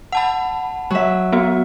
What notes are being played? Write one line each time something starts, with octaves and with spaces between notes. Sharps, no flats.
F#5 A5 B5
F#3 E5
B3 F#4